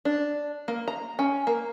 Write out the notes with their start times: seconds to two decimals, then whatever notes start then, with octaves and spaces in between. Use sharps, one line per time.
0.05 D4
0.68 A#3
0.88 A#5
1.19 C#4
1.47 A#3